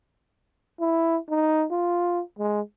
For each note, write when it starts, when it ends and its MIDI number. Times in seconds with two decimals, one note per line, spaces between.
0.80 1.17 64
1.30 1.66 63
1.71 2.21 65
2.39 2.61 56